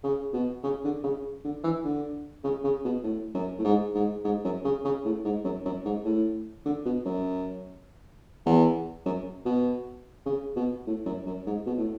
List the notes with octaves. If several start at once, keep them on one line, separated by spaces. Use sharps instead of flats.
C#3
B2
C#3
D3
C#3
D3
E3
D3
C#3
C#3
B2
A2
F#2
A2
G#2
G#2
G#2
F#2
C#3
C#3
A2
G#2
F#2
F#2
G#2
A2
D3
B2
F#2
E2
F#2
B2
C#3
B2
A2
F#2
F#2
G#2
B2
A2